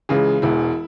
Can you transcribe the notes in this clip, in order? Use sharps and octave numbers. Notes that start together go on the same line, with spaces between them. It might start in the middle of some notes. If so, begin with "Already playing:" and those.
C#2 C#3 E3 G#3 G#4
E1 E2 E3 G#3 E4